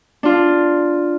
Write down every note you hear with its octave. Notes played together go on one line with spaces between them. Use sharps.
D4 F4